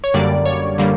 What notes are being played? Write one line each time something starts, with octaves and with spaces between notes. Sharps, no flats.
C#5
F#2 D3 G3 A#3 D5
C#5
D3 G3 A#3